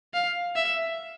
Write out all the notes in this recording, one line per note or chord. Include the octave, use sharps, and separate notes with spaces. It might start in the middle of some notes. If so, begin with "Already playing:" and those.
F5
E5